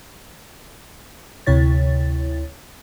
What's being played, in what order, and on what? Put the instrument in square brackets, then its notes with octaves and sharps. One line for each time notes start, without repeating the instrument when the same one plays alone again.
[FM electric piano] D2 C3 E4 C#5 A6